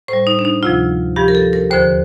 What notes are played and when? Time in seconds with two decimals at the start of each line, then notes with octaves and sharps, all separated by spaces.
0.08 A2 G3 C5
0.27 D#4
0.39 D4
0.45 D#4
0.63 D2 C3 F3 F4
1.16 G2 F3 G4
1.28 A#4
1.35 A4
1.53 A#4
1.71 D#2 D3 F3 C5